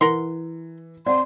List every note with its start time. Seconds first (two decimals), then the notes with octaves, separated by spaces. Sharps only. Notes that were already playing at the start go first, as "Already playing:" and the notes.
0.01 E3 A#4 F#5 C6
1.06 C4 D5 F#5 A5 C6